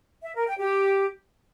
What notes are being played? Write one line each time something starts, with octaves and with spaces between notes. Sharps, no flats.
E5
A#4
G5
G4